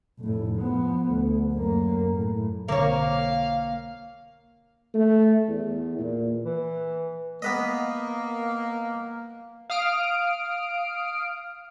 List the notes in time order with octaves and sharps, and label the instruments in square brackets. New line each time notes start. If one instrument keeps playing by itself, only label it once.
[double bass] F1 A2
F3 B3
D2
F#2 A#3
A2
[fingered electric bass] B1 D3 C4 [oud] A#3 C#5 [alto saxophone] F5
[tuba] A3
E2
A#2
[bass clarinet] E3
[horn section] A#3 [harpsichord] B3 B4 D#5
[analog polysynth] F5 D#6 F6 D7